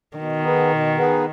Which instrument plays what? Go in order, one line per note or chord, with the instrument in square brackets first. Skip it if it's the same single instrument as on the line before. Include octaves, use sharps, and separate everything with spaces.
[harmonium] B2 [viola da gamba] D#3
[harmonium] B3 D#4 G#4 B4
B2
B3 D#4 G#4 B4